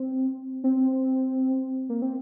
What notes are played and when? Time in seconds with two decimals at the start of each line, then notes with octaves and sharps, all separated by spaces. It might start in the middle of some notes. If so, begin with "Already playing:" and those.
Already playing: C4
0.64 C4
1.89 A#3
2.02 C4